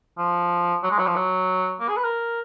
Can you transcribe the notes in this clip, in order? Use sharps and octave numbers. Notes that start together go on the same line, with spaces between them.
F3
F#3
G#3
F#3
F3
F#3
A#3
G#4
B4
A#4